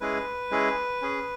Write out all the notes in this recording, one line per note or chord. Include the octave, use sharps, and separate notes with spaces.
G#3 C#4 E4 G#4 B4
G#3 C#4 E4 G#4
C#4 G#4